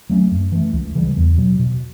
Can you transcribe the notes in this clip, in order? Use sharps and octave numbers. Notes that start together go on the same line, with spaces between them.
F#3 A3 C#4
F#2
E3 A3
C#2
C#3 E3 G3
E2
B2 F#3
B2